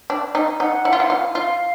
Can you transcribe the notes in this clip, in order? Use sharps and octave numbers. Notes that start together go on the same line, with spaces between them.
D4
D#4
D#4 F#5
E4
F4
E4
F4
F4 F5